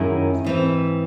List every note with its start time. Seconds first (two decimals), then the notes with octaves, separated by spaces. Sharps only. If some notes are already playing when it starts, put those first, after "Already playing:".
Already playing: F#2 D#3 G#3 C#4 E4
0.44 G#2 E3 C4